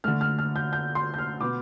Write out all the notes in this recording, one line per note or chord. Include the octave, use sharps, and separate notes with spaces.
D3 A3 F6
F6
F6
G6
G6
C6
G6
F6
B2 B3 D6